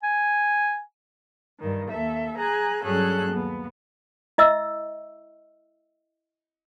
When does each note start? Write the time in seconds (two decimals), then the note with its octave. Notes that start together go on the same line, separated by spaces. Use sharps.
0.03 G#5
1.59 G2 D#3
1.89 D#2 A4 E5
2.37 G#4 G#5 A#5 F#6
2.83 G2 F#3 C#4 G#4 A4 F#6
3.31 D#2 B3
4.38 E4 D#5 E5 E6